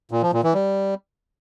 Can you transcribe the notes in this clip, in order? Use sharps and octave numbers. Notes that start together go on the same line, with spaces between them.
A#2
F3
A#2
E3
G3